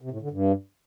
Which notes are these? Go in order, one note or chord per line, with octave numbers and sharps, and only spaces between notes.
C3
A2
D3
G2